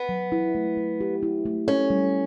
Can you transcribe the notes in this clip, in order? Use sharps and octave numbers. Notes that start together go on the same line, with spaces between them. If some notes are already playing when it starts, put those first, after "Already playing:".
Already playing: B3
F#3
E4
A3
A3
G4
E4
A3
C#4 A4
G3